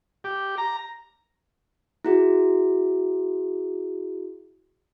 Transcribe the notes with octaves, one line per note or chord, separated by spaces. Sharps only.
G4
A#5
E4 F#4 G#4